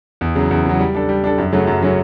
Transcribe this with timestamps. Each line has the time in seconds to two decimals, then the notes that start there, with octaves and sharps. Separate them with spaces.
0.21 E2
0.36 C#3 F#3
0.51 E2
0.65 C#3 F#3
0.80 G3
0.95 D4 A4
1.09 G3
1.24 D4 A4
1.38 F#2
1.52 C#3 F#3 A3 C#4
1.67 F#2
1.82 C#3 F#3 A3 C#4